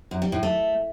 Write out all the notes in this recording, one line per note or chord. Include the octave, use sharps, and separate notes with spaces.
F#2
G3
A2
A3